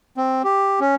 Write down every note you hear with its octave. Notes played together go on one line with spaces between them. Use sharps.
C4
G4
C#4